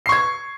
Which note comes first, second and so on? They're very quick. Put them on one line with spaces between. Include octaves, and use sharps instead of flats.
C7 C#6 G#6